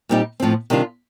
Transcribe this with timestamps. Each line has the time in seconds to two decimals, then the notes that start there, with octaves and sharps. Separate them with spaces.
0.09 A#2 G3 C4 D#4 G4
0.40 A2 F3 C4
0.70 C3 D#3 G3 D4 F4